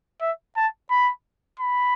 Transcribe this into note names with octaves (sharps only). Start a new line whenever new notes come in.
E5
A5
B5
B5